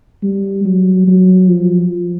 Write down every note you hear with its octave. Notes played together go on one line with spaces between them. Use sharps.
G3
F#3
F#3
F3